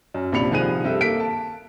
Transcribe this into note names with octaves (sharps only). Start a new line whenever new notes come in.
F#2
A#1 C3 D4 B5 C#7 F7
C2 D#3 F3 G#4 F#6 D#7
G2 C4 A4 E5
A#3 A4 B6 D7
A5